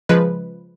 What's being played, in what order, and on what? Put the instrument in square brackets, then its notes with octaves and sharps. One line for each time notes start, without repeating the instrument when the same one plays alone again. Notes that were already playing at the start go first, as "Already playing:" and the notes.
[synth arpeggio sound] C#3 F3 G#3 B4